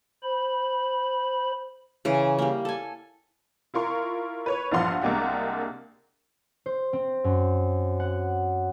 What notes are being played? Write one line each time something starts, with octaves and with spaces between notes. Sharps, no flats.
C5 B5
C#3 E3
G3 A#3
A4 G#5
E4 F4 A#4 C6 C#6
B4 C#5 C#6
A#1 G2 F3 F5 F#5 C6
C2 G#3 A#3 D4 G4 F#5
C5
C4
F#2
F#5